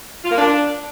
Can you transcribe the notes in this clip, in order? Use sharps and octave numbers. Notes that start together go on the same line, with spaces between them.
F4
A#3
D4